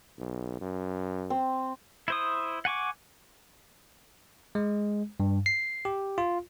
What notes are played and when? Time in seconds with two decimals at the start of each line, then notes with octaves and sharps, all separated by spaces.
0.18 B1
0.61 F#2
1.30 C4
2.08 E4 C5 D#6
2.65 F#5 G#5 C#6 D6
4.55 G#3
5.20 G2
5.46 C7
5.85 G4
6.18 F4